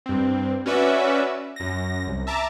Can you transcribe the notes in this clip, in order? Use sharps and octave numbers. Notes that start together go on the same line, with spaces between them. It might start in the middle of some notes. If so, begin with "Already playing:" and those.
G2 C4
C#4 F#4 B4 D5 E5
F#2 A#6
C2
E5 A5 A#5 D6